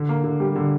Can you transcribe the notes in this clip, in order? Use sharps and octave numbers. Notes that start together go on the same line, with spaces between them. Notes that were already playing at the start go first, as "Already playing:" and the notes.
Already playing: D3
A#3
D3
G3
D3